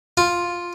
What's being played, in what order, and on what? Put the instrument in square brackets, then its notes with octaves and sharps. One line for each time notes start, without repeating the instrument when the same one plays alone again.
[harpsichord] F4